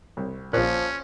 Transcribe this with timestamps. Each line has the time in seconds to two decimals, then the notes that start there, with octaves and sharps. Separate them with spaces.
0.17 C2
0.53 A#1 A#2 F3 C#4 D5 F5 F#6